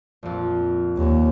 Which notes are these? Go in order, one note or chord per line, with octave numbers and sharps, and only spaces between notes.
A#1 F2
D#2